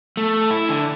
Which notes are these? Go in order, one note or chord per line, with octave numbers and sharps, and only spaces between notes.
A3
E4
D3